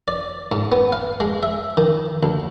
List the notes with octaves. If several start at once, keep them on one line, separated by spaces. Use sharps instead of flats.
D5
G#2
B3
F5
G#3
E5
D#3
D2